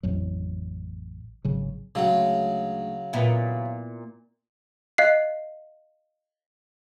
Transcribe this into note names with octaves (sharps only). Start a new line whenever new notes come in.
A1 F2 F#3
G#1 C#3 F#3
D2 C#3 F#3 G#3
A#2 B3 E4
D#5 F5 F#6 C7